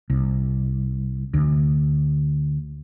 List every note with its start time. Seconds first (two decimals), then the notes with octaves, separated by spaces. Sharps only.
0.10 C2
1.34 D2